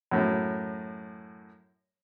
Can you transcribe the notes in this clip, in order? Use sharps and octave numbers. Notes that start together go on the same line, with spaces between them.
F#2 A2